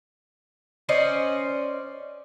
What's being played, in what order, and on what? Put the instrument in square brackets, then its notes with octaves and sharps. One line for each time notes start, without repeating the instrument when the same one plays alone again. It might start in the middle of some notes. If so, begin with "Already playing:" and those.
[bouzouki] C#4 C5 D5 D#5